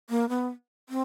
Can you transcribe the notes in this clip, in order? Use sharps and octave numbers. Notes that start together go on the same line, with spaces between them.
A#3
B3
C4